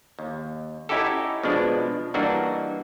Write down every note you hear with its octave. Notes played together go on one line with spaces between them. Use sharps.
D#2
C#4 D#4 E4 F#4 G4 A4
B2 F3 G#3 D4
G2 E3 A#3 D4 D#4 F#4